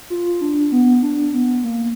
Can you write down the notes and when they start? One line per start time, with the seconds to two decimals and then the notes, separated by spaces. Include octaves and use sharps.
0.10 F4
0.41 D4
0.72 B3
1.02 D4
1.34 B3
1.64 A#3